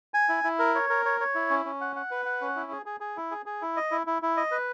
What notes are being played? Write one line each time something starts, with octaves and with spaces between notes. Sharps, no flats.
G#5
E4
E4
A#4
C#5
A#4
C#5
C#5
E4
C#4
C#4
F#5
F#5
B4
F#5
C#4
E4
G#4
G#4
G#4
E4
G#4
G#4
E4
D#5
E4
E4
E4
D#5
B4